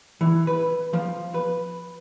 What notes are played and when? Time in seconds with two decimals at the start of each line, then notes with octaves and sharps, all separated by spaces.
0.21 E3
0.47 B4
0.93 F3
1.34 B4